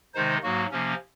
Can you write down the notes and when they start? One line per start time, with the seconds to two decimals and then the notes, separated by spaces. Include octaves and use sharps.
0.14 C3 D#3 G#3 D#4 C5
0.43 G#2 F#3 A#3 F#4
0.71 C3 F3 A#3 C#4